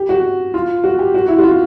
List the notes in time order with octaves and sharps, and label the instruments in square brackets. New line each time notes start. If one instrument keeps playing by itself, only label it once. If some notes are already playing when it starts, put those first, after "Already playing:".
Already playing: [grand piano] G4
F#4
F4
F#4
G4
F#4
E4
F#4
F4